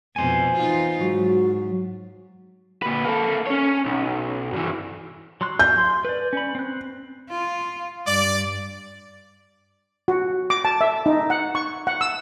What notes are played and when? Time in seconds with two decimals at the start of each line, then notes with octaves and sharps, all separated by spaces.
0.16 F2 B2 C5 G#5
0.57 E3 D#4 F4
1.01 G#2 F#3 F#4
2.82 A#2 B4
3.04 A#3 A4
3.47 C#4 C#5
3.85 B1
4.53 G2 E3
5.41 F#3 C6 F#6
5.59 G6
5.78 C6
6.05 B4 D5
6.33 C#4 B5
6.55 C4 F#6
7.30 F4
8.07 G2 D5
10.08 F#4
10.50 D6
10.65 A5
10.81 E5
11.06 D#4
11.30 F#5
11.55 C#6
11.87 F#5
12.01 E6